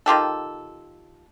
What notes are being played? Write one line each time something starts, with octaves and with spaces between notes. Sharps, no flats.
D#3 F4 G4 A4